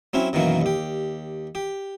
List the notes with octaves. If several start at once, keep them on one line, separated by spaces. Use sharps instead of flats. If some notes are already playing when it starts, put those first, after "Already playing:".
F#3 C4 C#4 E4
F#2 B2 D#3 E3 F#3 A#3
D#2 G4
G4